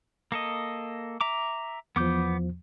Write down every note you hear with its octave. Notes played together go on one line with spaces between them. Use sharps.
A#3 A4 D#5
E5 A#5 D6
E2 F3 B3 D6 G6